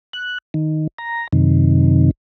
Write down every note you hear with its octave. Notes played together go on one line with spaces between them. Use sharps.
F#6
D#3
A#5
F#2 C3 D#3